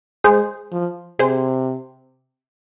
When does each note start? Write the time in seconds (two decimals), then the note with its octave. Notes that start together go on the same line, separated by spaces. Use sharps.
0.24 G#3 G#4 C5
0.72 F3
1.19 C3 G#4 C5